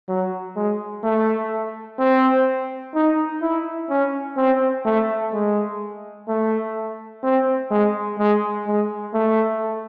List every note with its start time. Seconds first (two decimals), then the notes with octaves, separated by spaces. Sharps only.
0.08 F#3
0.56 G#3
1.04 A3
1.99 C4
2.95 D#4
3.42 E4
3.90 C#4
4.37 C4
4.85 A3
5.33 G#3
6.28 A3
7.23 C4
7.71 G#3
8.19 G#3
8.67 G#3
9.14 A3